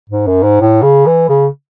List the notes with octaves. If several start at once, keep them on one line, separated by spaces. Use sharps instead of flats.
G#2
F#2
G#2
A2
C#3
E3
C#3